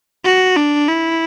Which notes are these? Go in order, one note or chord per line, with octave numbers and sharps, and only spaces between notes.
F#4
D4
E4